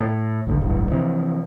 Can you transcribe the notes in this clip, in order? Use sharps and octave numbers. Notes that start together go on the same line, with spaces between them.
A2
A1 D#2 G#2 D3
D1 A1 E2 G2
C3 E3 F3